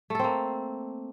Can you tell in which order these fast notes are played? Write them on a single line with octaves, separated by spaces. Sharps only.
A3 A4 C4 A#3